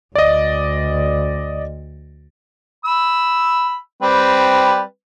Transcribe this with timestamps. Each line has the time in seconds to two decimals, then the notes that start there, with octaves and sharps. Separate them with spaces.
0.15 D2 D5 D#5
2.85 B5 E6
4.02 G3 C4 B4